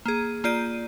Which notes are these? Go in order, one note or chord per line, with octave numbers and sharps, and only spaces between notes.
A#3 G#4
A#3 F4 D5 G6 D#7